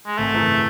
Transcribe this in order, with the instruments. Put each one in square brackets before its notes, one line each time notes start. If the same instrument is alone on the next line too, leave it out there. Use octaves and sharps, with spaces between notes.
[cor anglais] G#3
[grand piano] G#1 [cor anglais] A3
[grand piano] F#2 C#3 E3